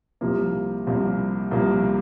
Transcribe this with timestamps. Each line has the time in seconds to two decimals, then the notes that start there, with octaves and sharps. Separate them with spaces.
0.21 C2 C3 F3 A#3
0.87 C2 C3 F3 A#3
1.51 C2 C3 F3 A#3